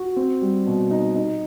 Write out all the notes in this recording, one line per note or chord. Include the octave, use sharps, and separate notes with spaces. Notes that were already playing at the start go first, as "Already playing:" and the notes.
Already playing: F#4
C4
G3
B2
D#4
D#4